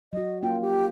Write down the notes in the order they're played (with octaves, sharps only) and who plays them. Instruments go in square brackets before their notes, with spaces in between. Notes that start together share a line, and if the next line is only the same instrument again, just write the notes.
[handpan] F#3 F#4 [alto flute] D#5
[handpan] A#3 C#4 F4 [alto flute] G5
[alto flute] G4